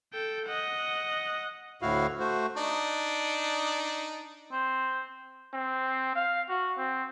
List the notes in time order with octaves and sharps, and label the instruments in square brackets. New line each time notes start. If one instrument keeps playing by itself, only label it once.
[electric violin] A4 G5
D#5 F#5
[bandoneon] D2 A2 E4 F#4 F5
A3 F#4 C5
[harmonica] D4 D#4
[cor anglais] C4
[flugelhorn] C4
F5
F#4
C4